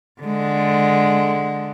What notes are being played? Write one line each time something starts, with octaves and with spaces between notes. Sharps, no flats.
D3 G#3